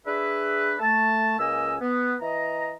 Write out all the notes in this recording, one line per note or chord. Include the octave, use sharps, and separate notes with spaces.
D4 G#4 B4 E5
A3 A5
C#2 A#3 C#4 D#5 G#5 E6
B3
E3 D#5 A#5